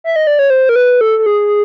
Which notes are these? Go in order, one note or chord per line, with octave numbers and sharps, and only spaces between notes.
E5
D#5
D5
C#5
C5
A#4
B4
A4
A4
G#4